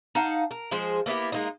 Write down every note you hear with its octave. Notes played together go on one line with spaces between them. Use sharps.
D#4 F5 F#5 A5
A#4
F3 G#3 G#4 C5
A#3 B3 E4 G4
G#3 A#3 D#4